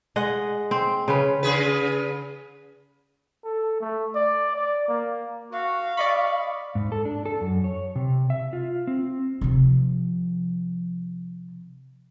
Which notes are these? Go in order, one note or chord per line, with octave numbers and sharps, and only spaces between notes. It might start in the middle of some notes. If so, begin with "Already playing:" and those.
G#3 D#5 F#5
C4
C#3 C#4 B4
C#3 G#4 B4
A4
A3
D5
D5
A#3
F#4 F5
D5 D#5 B5 C#6
G#2
A4
D4
A4
F#2
C#5
C3
E5
F4
C4
C3 F3